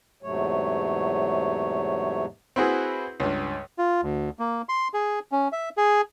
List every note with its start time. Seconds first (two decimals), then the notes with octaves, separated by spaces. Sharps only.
0.23 E2 G#2 C3 F#3 A3 C#5
2.56 C4 E4 F#4 G#4 B4
3.20 C#2 G2
3.78 F4
4.03 D2
4.39 A#3
4.69 C6
4.94 G#4
5.32 C#4
5.52 E5
5.77 G#4